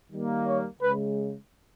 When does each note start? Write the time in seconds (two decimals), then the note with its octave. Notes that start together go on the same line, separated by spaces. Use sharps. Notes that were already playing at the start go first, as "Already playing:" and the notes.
0.11 D#3 G3 A#3
0.47 C#5
0.81 C#3 G#3 B4